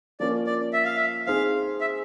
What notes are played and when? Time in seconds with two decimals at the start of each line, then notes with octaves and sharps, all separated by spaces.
0.20 F3 A#3 C#4 D5
0.46 D5
0.73 E5
0.85 F5
0.97 E5
1.27 C4 D#4 G#4 F5
1.81 E5